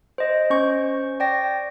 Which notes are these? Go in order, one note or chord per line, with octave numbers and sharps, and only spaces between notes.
C5 D#5
C#4 C5 C#6
D5 G5 A#6